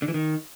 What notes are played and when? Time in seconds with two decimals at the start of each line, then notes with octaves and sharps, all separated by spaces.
0.02 D3
0.08 E3
0.14 D#3